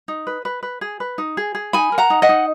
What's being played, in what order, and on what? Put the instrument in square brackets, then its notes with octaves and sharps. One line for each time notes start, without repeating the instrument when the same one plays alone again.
[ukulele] D#4
B4
B4
B4
G#4
B4
D#4
G#4
G#4
D#4 G#5 B5
A#4
F#5 A#5
D#4
D#5 F#5
D#4